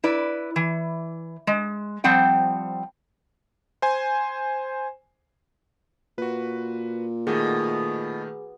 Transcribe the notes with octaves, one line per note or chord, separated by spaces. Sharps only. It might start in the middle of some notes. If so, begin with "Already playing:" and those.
E4 B4 D5
E3
G#3
F3 G3 C4 F#5 G5
C5 G#5
A#2 F#4 B4
B2 D#3 A3 G#4